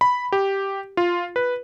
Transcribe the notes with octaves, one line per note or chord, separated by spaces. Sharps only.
B5
G4
F4
B4